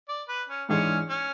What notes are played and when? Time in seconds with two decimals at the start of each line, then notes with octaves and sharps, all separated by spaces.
0.09 D5
0.29 B4
0.49 C#4
0.69 G#2 E3 G#3 C#4 D4 G#4
1.09 C#4